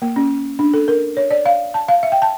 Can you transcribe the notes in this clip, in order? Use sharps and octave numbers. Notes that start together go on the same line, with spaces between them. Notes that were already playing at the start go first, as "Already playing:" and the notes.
A#3
C#4
D4
A4
A#4
C#5
D5
F5
A5
F5
E5
G5
A5